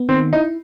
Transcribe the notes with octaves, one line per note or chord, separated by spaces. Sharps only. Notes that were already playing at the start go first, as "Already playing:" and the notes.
Already playing: B3
D#3 C4
D#4 E4